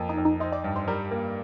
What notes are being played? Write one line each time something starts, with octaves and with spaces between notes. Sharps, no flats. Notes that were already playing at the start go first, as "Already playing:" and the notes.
Already playing: F2 A#3
D#4
F2
D#4
D#4 C5
D5
G2
C5
G3 A#4
A#3